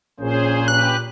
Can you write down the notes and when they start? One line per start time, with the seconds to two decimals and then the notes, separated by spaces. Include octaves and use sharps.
0.20 A#1 A#2 A#3 C#4 G#4 C5
0.68 G4 B4 F#6